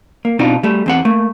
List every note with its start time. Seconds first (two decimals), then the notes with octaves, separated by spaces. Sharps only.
0.25 A#3
0.39 B2 C4 D4 D#4 F4
0.63 G3 A3
0.86 E2 C4 F#5
1.05 A3 A#3